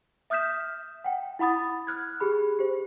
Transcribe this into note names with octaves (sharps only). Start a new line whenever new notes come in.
E5 D#6 F6 G6 B6 E7
F#5 G5
E4 F#5 B5 D#6 A6
F6 F#6 G#6
G4 G#4 B5
G4 C5